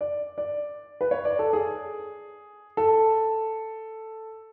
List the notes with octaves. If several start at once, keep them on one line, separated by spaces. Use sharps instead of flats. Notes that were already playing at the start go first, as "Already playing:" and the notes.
D5
D5
B4
C#5
D5
A4
G#4
A4